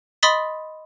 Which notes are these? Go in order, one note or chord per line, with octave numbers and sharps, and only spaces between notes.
D#5 B5 C6 D#6 A6 B6